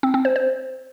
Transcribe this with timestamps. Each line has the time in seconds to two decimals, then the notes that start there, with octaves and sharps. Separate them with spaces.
0.03 C4
0.14 C4
0.25 C5
0.36 C5